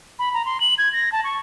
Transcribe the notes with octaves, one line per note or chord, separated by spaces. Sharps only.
B5
A#5
C6
F#7
G#6
A#6
A5
C#6